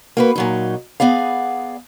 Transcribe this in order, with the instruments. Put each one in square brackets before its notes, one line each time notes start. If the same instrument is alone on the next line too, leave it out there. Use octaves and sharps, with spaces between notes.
[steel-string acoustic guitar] A#3 F#4 B4
A#2 F#3 D#4
B3 G#4 D5 F5